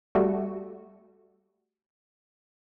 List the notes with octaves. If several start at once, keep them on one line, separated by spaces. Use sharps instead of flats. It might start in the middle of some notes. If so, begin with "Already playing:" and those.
G3 A3 F#4